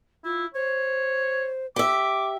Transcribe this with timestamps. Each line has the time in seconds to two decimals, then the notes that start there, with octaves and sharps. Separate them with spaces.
0.25 E4 F4
0.54 C5 C#5
1.76 G4 E5 D6